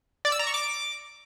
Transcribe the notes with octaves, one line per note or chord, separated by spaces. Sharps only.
D5
E6
A#5
C#6
D6